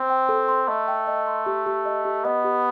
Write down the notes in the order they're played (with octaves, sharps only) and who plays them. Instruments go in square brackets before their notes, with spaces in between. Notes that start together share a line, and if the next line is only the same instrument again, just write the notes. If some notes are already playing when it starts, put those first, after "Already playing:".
Already playing: [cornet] C4
[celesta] G5
A4
C6
[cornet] A3 [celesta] D#5
[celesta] G5
D#5
C6
G4
G4
D#5
G4
[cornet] B3 [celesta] D#5
[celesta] G4